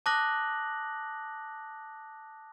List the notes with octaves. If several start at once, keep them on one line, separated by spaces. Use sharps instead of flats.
A5 D6 D#6 F#6 A#6 F#7